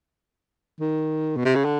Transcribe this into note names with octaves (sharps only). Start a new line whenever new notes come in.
D#3
B2
C3
C#3
D3